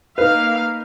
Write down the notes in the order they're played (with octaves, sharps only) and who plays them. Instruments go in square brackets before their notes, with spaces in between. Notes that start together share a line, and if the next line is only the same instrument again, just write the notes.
[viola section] A#3 F5 [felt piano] D#4 B4